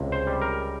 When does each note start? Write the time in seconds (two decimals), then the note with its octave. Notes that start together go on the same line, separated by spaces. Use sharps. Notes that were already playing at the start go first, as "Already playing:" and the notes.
Already playing: C#2 C3
0.12 C5
0.27 G3
0.42 A#4